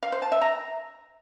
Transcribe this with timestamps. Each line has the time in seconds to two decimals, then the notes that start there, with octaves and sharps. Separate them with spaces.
0.03 F5
0.12 C5
0.22 A5
0.32 E5
0.41 A#5